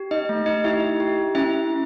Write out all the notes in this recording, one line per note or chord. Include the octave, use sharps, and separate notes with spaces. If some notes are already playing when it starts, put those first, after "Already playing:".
Already playing: G4
D#4 D#5
A3
D#4 D#5
E4 G4 E5
G4
C#4 E4 E5